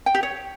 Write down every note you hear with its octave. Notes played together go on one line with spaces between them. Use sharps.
G5
G4
C#5